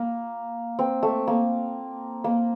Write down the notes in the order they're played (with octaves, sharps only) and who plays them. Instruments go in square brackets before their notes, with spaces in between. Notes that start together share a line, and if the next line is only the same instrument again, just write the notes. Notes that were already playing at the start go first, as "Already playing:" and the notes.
Already playing: [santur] A#3
C4
A3
A#3
A#3